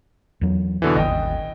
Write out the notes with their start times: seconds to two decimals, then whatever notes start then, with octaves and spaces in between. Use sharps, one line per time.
0.41 E2 F#3
0.82 B2 D3 E3
0.96 D#1 G#1 D#5 G5